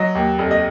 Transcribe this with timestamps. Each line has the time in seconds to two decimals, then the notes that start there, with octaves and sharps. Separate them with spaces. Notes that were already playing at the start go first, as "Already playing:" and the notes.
Already playing: F#3 D#5
0.15 D#2
0.39 F1
0.51 D#5